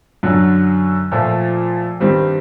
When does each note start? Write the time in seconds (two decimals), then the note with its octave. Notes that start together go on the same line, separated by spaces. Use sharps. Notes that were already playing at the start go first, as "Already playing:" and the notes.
0.23 F#2 D3 F#3
1.12 A#2 F3 A3
2.00 G2 D#3 G3 C4